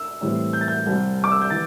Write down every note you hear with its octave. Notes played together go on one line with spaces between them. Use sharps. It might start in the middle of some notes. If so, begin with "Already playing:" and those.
Already playing: E6
A2 E3 G3 C4
G6
A6
G6
C2 C3 G3 C4
D6
E6
G6
E3 A6